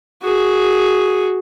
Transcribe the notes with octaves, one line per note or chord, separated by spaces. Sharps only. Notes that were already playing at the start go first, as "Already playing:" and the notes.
F#4 G#4